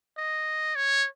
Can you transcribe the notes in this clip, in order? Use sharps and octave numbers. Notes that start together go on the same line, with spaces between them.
D#5
C#5